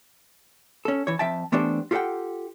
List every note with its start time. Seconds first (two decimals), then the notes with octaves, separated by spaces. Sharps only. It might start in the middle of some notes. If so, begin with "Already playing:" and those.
0.85 C#4 A4
1.07 E3 C#5
1.19 F2 E5 G5 A5
1.52 E3 A3 B3 D4 G4 C5
1.91 F4 G4 A4 B4 F#5 G5